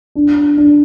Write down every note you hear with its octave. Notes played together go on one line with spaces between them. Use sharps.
D4
D4